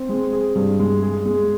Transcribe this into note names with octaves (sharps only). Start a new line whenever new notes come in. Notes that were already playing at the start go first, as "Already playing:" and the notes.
Already playing: C4
G#3
G#4
G2
G#3
G#4
G#3